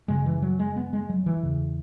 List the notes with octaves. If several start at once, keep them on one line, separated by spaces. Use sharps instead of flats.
F#2 C#3 G#3
E3
F#3
G#3
B3
G#3
F#3
E3
E2 C#3